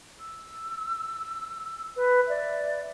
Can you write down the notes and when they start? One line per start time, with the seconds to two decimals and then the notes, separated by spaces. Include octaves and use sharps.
0.20 E6
1.96 B4
2.27 D5 E5